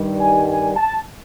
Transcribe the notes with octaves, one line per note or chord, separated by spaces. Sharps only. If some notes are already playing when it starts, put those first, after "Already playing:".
Already playing: G2 D#3 G3
G#5
G#5
A5